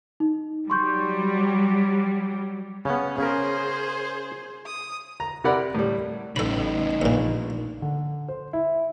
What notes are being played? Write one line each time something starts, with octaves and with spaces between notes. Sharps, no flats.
D#4
F#3 G3 C6 C#6 G6
C#3 B3 C#4
C#3 C#4 G#4 A#4 C5
D#6
A#5
C3 E4 A#4 D5 F#5 B5
A2 G3
A1 A2 C#3 D#4 A4 B5
A#1 E2 A#2
D3
C5
E4